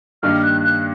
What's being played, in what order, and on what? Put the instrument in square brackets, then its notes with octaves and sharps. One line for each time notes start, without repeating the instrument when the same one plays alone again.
[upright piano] G2 D#3 G3 A#3 D4 [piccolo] F6
[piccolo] F#6
F#6